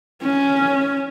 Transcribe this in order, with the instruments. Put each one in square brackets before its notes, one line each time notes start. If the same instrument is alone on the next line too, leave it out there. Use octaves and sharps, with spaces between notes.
[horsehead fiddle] C#4